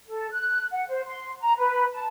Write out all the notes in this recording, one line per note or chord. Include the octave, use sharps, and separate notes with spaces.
A4
F#6
F#5
C5
C6
A#5
B4
A5